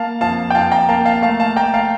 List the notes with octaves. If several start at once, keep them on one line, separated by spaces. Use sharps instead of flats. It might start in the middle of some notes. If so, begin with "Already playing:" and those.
Already playing: A#3 F5 A5
F2 F5 A5
G5
F2 F5 A5
G5 A#5
A#3 F5 A5
F5 A5
A3 F5 A5
F5 A5
A3 G5 A#5
F5 A5